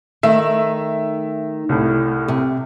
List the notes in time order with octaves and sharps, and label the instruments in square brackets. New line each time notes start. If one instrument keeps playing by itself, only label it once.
[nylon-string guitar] D#3 A3 [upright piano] E5
[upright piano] C2 A2
[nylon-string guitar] C3